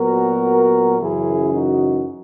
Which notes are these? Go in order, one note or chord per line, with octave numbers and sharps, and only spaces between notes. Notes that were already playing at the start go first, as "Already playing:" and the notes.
Already playing: A#2 F#3 B3 F#4 A#4
F#2 C#3 E3 E4 G#4
D#4 F#4